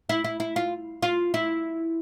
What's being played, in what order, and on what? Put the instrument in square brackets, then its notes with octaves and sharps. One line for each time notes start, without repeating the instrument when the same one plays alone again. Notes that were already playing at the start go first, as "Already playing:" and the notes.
[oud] E4
E4
E4
F4
F4
E4